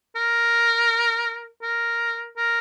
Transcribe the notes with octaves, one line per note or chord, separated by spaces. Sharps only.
A#4
A#4
A#4